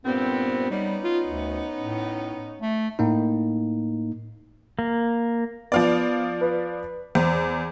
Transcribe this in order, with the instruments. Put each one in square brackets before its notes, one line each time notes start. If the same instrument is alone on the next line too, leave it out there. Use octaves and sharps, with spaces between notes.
[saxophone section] G2 A#2 C4 [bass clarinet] B3
[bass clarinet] G3 [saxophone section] B3 C#4 D#4
[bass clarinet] F4
D2
A2
A3
[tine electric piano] A2 A#3 D#4
[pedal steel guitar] A#3
[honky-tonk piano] F3 F4 D5 [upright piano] B3
[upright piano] B4
[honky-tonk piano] E2 [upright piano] C5